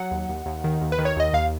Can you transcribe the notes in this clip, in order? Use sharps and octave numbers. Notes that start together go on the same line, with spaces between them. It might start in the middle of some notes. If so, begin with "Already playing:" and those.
Already playing: F#3 F#5
D#2
D#2
D#2
D#3
D#2
B4
D#3
C#5
D#2 D#5
D#2 F5